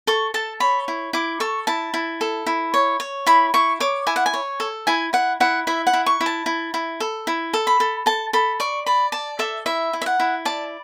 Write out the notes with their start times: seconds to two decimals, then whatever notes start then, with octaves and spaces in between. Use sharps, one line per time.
0.07 A4 C#6
0.34 A4 A5
0.60 C#5 B5
0.88 E4
1.13 E4 D6
1.40 A4 C#6
1.67 E4 A5
1.94 E4
2.21 A4
2.47 E4
2.74 C#5
3.00 C#5
3.27 E4 B5
3.54 E4 C#6
3.80 C#5 D6
4.07 E4 G#5
4.16 F#5
4.26 G#5
4.34 C#5
4.60 A4
4.87 E4 G#5
5.13 E4 F#5
5.40 E4 F#5
5.67 E4 E5
5.87 F#5
5.93 E4
6.06 C#6
6.21 E4
6.26 A5
6.46 E4
6.74 E4
7.00 A4
7.27 E4
7.54 A4
7.67 B5
7.80 A4
8.06 A4 A5
8.33 A4 B5
8.60 D5 C#6
8.86 D5 B5
9.12 D5 A5
9.39 A4 E5
9.66 E4 E5
9.93 E4
10.02 E5
10.06 F#5
10.20 E4
10.45 D5 A5